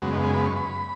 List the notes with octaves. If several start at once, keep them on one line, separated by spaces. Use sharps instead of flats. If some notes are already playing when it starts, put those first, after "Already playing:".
F#2 C#3 G#3 B3 F#4
D#4
G#4
B5
C#6
B5